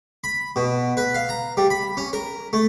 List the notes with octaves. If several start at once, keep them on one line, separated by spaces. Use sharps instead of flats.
B5
B2
B4
F5
A#5
G3
B5
C#4
A#4
A3